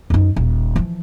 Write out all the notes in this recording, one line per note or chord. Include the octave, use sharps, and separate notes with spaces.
F#2 D#4
D#1
E3 F3